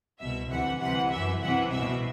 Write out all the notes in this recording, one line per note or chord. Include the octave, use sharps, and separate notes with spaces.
C2 B2 E5
D2 C3 E3 F#5
C2 C3 E3 F#5
F#2 E3 E5
C2 C3 E3 F#5
C2 B2 E5